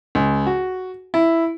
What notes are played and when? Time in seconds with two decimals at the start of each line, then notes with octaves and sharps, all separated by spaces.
0.15 C#2
0.47 F#4
1.14 E4